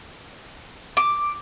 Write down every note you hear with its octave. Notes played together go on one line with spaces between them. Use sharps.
D6